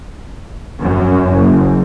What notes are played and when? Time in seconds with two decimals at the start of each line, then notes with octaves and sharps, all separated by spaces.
0.81 F#2
1.31 F#1